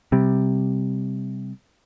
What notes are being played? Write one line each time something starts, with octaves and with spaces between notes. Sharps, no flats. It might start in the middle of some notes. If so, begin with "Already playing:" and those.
C3 G3